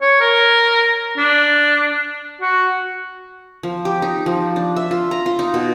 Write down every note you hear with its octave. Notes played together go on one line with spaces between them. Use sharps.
C#5
A#4
D4
F#4
F3
G4
D#4
F3
D4
E5
F4
A#5
F4
D#4
B2